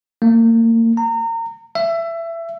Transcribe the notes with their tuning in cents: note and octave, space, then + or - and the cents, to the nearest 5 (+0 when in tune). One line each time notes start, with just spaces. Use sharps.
A#3 -35
A#5 -30
E5 +20